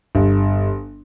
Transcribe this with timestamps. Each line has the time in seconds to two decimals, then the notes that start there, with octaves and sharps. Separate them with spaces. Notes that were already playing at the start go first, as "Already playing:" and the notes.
0.15 G1